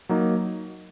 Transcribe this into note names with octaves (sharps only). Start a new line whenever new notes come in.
F#3 A#3 D#4